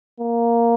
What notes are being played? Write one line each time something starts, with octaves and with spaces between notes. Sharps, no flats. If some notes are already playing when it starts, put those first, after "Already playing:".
A#3